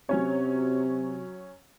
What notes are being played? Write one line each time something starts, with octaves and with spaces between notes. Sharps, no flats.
C3 F#3 C#4 C#5